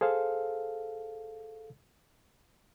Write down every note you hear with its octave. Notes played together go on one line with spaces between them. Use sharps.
G#4 A4 C5 F5